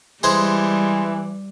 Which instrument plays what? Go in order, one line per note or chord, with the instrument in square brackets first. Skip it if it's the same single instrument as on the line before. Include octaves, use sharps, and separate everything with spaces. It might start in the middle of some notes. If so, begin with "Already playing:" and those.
[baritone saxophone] E3 [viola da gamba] G3 [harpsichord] G#3 G#4 C5